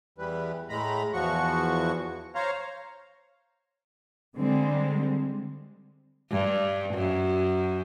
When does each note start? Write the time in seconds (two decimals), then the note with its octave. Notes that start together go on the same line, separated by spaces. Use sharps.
0.18 E2 E3 G3 B4
0.69 A2 G#3 A#5 B5
1.14 E2 F3 F#4 C#6
2.35 C5 C#5 F5 A#5
4.36 D3 G3 G#3 C4
6.31 G2
6.94 F#2